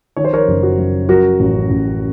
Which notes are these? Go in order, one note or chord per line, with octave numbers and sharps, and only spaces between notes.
D#3 C#5
C5
A#4 C#5
F#1
F#4
F#2
F#3 F#4 A#4
A1
A1